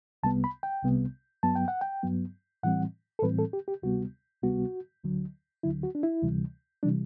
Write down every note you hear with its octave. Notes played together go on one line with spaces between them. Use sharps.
C2 C3 G3 B3 A5
B5
G5
C2 C3 G3 B3
G2 F#3 B3 A5
G5
F#5
G5
G2 F#3 B3
A2 E3 G3 C4 F#5
A4
A2 E3 G3 C4 B4
A4
G4
G4
D2 C3 G3 B3 F#4
D2 C3 G3 B3 F#4
D2 D3 F#3
D2 D3 F#3 E4
F#4
D4
E4
D2 C3 E3 G3
C3 E3 G3 D4